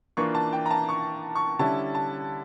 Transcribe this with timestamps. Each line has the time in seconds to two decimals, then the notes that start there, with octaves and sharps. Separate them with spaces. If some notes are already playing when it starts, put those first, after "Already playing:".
0.17 E3 A#3 D4 F4 C#6
0.35 A5
0.53 G5
0.66 A#5
0.71 A5
0.89 C#6
1.36 C#6
1.59 D3 G3 C#4 E4 A5
1.95 A5